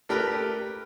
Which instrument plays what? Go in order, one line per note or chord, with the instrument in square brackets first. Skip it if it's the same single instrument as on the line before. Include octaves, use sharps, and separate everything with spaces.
[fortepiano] A3 G4 A#4 B4